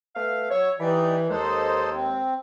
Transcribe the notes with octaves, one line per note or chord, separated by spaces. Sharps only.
A3 B3 F5
F#3 C#5 E5
E3 D#4 G4 D5
D#2 G#3 D#4 A4 C5
C4